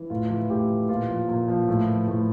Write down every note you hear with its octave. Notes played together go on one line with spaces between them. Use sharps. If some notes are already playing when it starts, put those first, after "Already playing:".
Already playing: E3
A2 F4
E3
A2 G4
E3
A#2 F4
F3
A#2
F3
A2
E3
A2